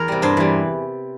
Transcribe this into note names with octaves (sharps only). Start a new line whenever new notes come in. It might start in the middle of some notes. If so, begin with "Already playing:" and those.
Already playing: E2 A#4
C3 G3
G2 C5
E3 G3